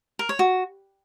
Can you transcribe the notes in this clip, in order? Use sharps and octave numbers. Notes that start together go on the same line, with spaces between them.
A#4
C#5
F#4